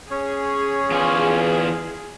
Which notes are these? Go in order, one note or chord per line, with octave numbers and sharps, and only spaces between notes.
C#4 G#4 C#5
E2 F4 G#5